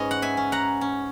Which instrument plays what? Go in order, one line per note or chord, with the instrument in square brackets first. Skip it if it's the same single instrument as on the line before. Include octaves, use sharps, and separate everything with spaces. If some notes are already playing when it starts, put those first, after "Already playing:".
Already playing: [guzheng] G#2 G#3 C#4 B4 D#5
F#5
E5 G#5
C#4
F#5 A#5
C#4